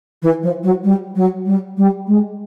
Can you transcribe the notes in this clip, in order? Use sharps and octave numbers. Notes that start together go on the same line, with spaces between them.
E3
F3
F#3
G3
F#3
G3
G3
G#3